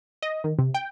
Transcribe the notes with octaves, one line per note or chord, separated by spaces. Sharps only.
D#5
D#3
C3
G5